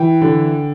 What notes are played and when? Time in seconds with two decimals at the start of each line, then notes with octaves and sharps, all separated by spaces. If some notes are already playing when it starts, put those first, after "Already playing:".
Already playing: E3 G5
0.22 D3